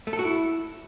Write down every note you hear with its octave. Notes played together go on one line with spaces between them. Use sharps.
A3
A4
F#4
E4